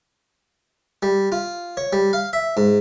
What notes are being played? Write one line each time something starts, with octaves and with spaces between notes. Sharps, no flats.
G3
F4
C#5
G3
F5
E5
G#2